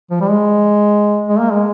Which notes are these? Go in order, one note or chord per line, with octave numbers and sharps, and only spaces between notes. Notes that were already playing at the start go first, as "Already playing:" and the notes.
F3
G3
G#3
G#3
A#3
G#3